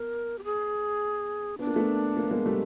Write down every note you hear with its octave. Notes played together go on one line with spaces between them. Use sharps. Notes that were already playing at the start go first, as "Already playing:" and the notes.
Already playing: B3 A#4
G4
G#4
B3 D4
A#3
A3 B3
A#3
B3
G#3 A#3
G3 A3